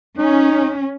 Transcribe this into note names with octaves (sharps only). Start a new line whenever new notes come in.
C#4 D#4